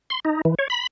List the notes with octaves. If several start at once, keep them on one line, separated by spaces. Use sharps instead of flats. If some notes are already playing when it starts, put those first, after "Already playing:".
C6
D#4
E3
C#5
B5